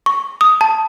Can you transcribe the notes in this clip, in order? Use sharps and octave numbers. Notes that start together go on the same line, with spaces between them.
C#6
D#6
A5